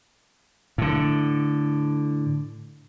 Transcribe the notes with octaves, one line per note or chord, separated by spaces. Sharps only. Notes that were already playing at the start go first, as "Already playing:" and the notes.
A2 D3